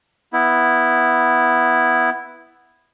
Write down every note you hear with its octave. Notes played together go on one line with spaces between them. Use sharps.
B3 E4